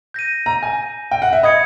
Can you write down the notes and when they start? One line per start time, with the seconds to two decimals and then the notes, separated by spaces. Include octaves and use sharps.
0.14 G6 A#6 D#7
0.46 A#5
0.63 G#5
1.11 G5
1.22 F#5
1.33 E5
1.43 D#5 B5 D#6 G#6 C#7